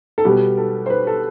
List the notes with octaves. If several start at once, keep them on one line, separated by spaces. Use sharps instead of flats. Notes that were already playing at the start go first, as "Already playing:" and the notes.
A4
B2 G3 B3 G4
A4
C5
B4
A4